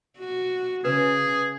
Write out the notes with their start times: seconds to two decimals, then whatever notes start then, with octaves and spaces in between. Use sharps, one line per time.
0.19 F#4
0.85 C#3 G#4 B4